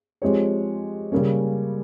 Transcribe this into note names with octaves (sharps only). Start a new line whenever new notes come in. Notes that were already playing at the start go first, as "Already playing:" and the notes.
F3 G#3 C4 G4 C#5
C#3 G3 A#3 C#4